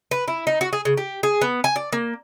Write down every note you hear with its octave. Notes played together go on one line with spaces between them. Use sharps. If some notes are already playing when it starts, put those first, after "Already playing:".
B4
E4
D#4
F#4
G#4
C#3
G4
G#4
B3
G#5
D5
A#3